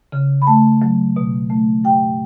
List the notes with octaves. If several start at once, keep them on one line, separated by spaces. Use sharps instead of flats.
C#3
B5
A3 A5
F#3
B2
A3
G2 G5